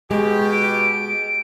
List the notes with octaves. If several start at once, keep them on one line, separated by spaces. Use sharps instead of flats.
B2 G#3 G4
D7